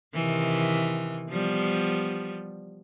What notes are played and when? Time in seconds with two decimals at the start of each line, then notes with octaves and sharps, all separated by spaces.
0.14 C3 D#3 E3
1.29 F3 G3 B3